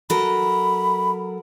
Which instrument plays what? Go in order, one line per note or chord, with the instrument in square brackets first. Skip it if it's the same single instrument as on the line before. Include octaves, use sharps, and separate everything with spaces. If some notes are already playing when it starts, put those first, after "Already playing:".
[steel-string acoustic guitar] F#3 A4 A#4 [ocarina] B5